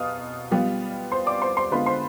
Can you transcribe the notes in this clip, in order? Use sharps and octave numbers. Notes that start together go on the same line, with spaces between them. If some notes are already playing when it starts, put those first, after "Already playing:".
Already playing: B2 B4 F5 D#6 F6
G3 B3 F4
C5 C6
D5 D6
C5 C6
C5 C6
D3 G#3 B3 F4 B4 B5
C5 C6